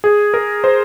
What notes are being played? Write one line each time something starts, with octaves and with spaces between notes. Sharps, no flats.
G#4
A#4
C5